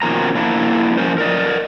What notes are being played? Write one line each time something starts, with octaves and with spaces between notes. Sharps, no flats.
B2 D#3 F3 A#3 C#4 A#5
F3 A#3 D4 E4
F3 G3 C#4 A#4 C5
A#4 D5 D#5